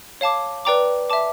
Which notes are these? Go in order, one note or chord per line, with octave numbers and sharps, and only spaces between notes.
C#5 F5 A5 D6
B4 D5 G5 A#5 D6
E5 A5 D6